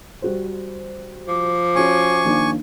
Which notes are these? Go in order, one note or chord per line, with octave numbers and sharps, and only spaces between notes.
G3 F#4 C5
F3 D6
C#4 F#4 G#5 C#6
D#3 A#3 D4